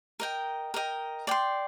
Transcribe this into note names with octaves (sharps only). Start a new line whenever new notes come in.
A#4 D#5 G5
A#4 D#5 G5
D5 G5 C6